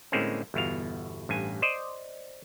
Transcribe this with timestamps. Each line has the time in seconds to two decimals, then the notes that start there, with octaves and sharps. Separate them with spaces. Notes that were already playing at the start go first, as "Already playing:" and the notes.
0.12 A2 D3 G#3 A#3 C4 C#4
0.54 G1 E2 B2 F5
1.29 A1 G2 G#5
1.62 C5 D5 D#5